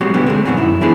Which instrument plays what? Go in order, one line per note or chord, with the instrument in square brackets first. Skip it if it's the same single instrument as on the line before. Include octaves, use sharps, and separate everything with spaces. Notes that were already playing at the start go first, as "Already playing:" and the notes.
[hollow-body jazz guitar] F#3 G#3 C4 F#4 G4
D2 B2 D3 G3 B3 C#4
G#3 A3 C4
F2 B2 D#3 F#3 C4 C#4
F#2 E4
E3 B3 D4 E4 G#4 A4